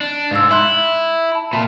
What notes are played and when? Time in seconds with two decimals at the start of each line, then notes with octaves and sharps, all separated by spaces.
0.01 D4
0.31 G#2 F5 E6
0.51 E4 E5 C6 F#6
1.32 A5 B5
1.53 A#2 E5 A5